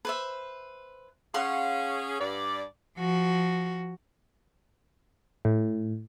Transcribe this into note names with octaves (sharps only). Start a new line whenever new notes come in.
B4 C5 E5
C#4 G#4 F5 F#5 C6
G2 D5
F3 F#4
A2